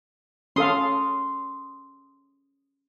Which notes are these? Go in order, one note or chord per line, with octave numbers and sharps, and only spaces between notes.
C#4 A4 F5 C6 D#6